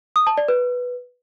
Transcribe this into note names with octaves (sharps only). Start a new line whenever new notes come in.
D#6
A5
D5
B4